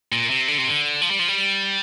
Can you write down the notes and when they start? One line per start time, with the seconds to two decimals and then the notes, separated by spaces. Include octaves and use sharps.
0.12 A#2
0.30 C3
0.48 D3
0.58 C3
0.68 D3
1.01 F3
1.11 G3
1.19 F3
1.28 G3